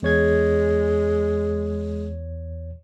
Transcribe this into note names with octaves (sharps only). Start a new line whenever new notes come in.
E2 G#3 C#5 G#6